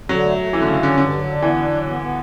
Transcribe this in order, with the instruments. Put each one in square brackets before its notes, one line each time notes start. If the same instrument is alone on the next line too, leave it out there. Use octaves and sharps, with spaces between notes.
[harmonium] D3 [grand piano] F#3
[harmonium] A3
A3
[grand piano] E3 [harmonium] A3
[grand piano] D3
[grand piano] C#3 [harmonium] C#4
[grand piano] D3 [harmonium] C#4
[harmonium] G2 [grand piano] D3
[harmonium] F#3
D4
[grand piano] E3 [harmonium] B3
[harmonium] D4
F#3
B3
B3